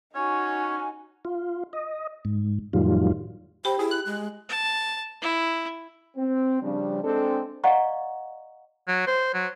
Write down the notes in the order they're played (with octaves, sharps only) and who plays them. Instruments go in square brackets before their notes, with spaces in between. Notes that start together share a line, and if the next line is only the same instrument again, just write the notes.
[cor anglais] C#4 [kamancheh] D#4 F#4 [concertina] C#5 [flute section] G#5
[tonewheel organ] F4
D#5
G#2
F2 A2 D#3 F#3 G3 F4
[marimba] G4 G5 B5 [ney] C5
[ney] E4 [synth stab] G#4
[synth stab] F#6
[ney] G#3
[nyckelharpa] A5
E4
[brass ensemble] C4
C#3 F3 G3 D4
G#3 C4 D4 A4
[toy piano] D5 D#5 F5 F#5 A#5 C#6
[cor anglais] F#3
C5
F#3